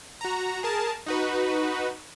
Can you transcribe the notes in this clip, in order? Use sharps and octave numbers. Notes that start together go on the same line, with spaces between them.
F#4 A#5
G#4 A#4 A5
D#4 F#4 B4